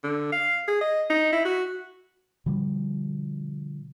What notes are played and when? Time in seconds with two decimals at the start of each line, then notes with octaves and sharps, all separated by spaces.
0.04 D3
0.32 F5
0.68 G#4
0.81 D#5
1.10 D#4
1.32 E4
1.45 F#4
2.46 B2 D3 F3 G3